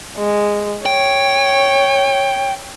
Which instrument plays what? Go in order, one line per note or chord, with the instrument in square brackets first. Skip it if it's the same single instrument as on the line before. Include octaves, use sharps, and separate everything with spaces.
[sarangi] G#3
[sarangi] C#5 [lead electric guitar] G5